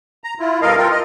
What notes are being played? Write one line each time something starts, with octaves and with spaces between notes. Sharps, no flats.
A#5
E4 F4
G2 B2 A4 A#4 D#5 F5
C4 F4 A4 A#4
D#5